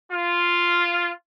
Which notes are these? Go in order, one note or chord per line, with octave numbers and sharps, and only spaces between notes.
F4